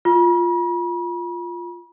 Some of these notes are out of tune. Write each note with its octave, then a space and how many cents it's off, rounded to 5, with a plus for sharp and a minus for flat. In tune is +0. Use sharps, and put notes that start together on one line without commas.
F4 +0 B5 -40